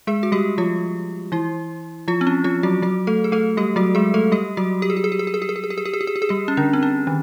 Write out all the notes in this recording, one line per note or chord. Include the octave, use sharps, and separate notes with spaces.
G#3 G#4
F#4
G3 G4
F3 F4
E3 E4
F3 F4
C4
C#4
F3 F4
F#3 F#4
F#3 F#4
A3 A4
G#4
A3 A4
G3 G4
F#3 F#4
G#3 G#4
A3 A4
G3 G4
F#3 F#4
G4
G#4
G4
G#4
G4
G#4
G4
G#4
G4
G#4
G4
G#4
G4
G#4
G4
G#4
G4
G#4
G4
G#4
G3 G4
C#4
D3 D4
C4
C#4
D#3